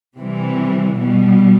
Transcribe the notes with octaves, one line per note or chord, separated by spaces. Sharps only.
C3 E3 G3
B2 G3